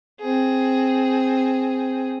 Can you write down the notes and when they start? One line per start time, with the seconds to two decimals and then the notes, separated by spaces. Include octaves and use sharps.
0.21 C4 G#4